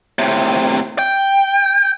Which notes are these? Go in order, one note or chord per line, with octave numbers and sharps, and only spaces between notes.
A2 C3
G5